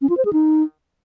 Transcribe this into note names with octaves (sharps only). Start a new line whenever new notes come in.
C#4
F4
C5
G#4
D#4